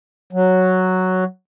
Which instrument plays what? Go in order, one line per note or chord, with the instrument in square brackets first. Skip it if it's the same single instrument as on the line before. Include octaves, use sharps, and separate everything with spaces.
[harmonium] F#3